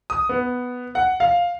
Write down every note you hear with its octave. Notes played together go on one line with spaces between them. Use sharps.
D#6
B3
F#5
F5